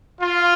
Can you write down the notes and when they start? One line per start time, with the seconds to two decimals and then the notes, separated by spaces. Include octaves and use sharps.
0.22 F4